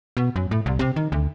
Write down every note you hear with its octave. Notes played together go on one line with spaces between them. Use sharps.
B2
F#2
A2
C2
C3
D#3
D2